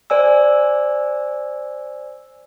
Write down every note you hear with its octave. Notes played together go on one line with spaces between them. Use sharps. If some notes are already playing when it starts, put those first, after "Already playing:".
C5 D5 G#5 E6